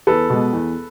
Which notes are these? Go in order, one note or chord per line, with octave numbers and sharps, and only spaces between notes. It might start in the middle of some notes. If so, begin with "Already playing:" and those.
E2 A4 B4
B2 G#3
E2